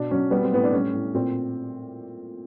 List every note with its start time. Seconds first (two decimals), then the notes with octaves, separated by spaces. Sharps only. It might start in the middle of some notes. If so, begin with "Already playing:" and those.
Already playing: B2 D4
0.11 F#3 C#4
0.31 G3 B3
0.43 C4
0.52 A2 B3
0.64 D4
0.73 G3 C#4
0.93 A2
1.14 A#2 C4